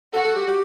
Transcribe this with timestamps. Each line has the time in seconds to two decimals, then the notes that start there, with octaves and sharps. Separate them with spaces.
0.13 F#4 A4
0.25 A4
0.36 G4
0.47 G4